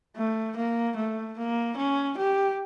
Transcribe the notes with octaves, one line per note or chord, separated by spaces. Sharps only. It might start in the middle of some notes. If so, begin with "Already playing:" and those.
A3
A#3
A3
A#3
C#4
G4